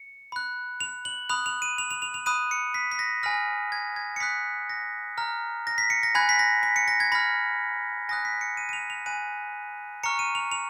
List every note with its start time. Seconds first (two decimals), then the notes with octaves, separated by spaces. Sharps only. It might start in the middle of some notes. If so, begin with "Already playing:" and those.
Already playing: C#7
0.32 B5 F#6
0.80 F7
1.05 F#7
1.29 B5 D#6 F#6 F7
1.46 F7
1.62 D#7
1.78 F7
1.91 F7
2.02 F7
2.14 F7
2.26 B5 D#6 F#6 D#7
2.51 C#7
2.74 B6
2.92 B6
2.99 A#6
3.23 G#5 B5 F6 A#6
3.72 G#6
3.96 G#6
4.16 C#7
4.20 B5 D#6 F#6 B6
4.70 A#6
5.18 A#5 F6
5.67 A#6
5.78 B6
5.90 C#7
6.03 A#6
6.15 G#5 B5 F#6 G#6
6.29 B6
6.39 A#6
6.63 B6
6.76 C#7
6.88 A#6
7.00 G#6
7.12 B5 F6 A#6
8.09 G#5 D#6 F#6 A#6
8.25 B6
8.41 C#7
8.57 D#7
8.69 D#7
8.73 F7
8.90 F7
9.06 G#5 B5 F#6 D#7
10.03 A#5 C#6 F6 C#7
10.19 D#7
10.35 F7
10.52 F7